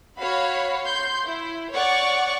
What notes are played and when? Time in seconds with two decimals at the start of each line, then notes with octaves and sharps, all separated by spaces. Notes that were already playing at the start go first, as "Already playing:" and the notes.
0.18 F#4 C#5 F5 B5
0.83 C6 G6
1.26 E4
1.73 C#5 D5 F#5 C#6 D6